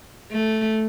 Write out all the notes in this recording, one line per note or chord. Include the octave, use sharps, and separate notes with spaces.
A3